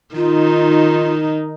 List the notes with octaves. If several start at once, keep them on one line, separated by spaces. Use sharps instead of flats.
D#3 D#4 F4